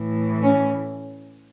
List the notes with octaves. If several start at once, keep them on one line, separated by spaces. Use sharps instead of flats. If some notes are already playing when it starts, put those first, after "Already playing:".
Already playing: A2 E3
C#4